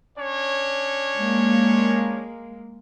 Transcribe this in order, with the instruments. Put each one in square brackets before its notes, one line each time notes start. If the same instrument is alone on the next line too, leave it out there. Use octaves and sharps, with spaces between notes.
[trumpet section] C#4 D4 C#5
[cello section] G#3 A#3